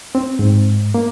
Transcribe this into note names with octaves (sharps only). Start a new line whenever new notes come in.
C4
G#2
A#3